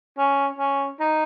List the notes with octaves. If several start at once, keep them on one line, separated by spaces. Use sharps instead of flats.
C#4
C#4
D#4